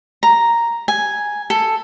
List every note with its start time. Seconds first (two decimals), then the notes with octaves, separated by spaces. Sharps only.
0.23 A#5
0.88 G#5
1.50 A4